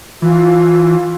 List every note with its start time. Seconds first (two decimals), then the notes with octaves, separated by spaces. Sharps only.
0.22 E3 F4